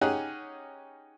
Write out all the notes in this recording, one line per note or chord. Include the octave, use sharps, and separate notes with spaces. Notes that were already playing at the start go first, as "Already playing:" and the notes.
C#4 D#4 G4 G#4 F#5